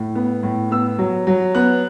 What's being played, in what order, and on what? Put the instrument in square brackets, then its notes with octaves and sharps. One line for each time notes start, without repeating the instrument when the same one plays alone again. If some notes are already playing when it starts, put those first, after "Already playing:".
Already playing: [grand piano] A2
B3
A2
B3 E6
F#3
F#3
B3 F#6